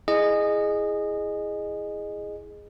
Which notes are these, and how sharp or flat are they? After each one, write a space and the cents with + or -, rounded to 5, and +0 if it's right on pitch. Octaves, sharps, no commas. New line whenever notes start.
E4 +0 G#4 +0 D#5 -20